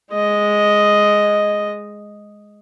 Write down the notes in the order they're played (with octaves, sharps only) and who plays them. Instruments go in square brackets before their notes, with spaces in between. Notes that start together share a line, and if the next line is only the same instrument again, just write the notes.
[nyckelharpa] G#3 D#5